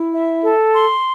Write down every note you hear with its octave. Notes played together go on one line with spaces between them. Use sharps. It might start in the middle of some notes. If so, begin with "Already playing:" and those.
Already playing: E4
E5
A4
C6